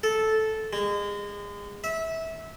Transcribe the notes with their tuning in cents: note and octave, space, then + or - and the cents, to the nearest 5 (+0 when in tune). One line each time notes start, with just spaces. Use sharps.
A4 -10
G#3 -30
E5 -20